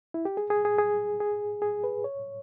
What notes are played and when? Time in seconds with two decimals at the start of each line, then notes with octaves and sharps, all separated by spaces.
0.14 E4
0.25 G4
0.37 G#4
0.50 G#4
0.65 G#4
0.78 G#4
1.20 G#4
1.62 G#4
1.84 B4
2.04 C#5